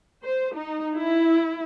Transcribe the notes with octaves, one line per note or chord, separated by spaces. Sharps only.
C5
D#4
E4